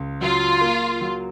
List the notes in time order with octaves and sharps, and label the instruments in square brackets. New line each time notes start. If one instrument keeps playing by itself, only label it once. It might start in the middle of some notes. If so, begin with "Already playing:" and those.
Already playing: [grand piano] C#2
[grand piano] F#3 [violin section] F4
[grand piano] A#3
F#3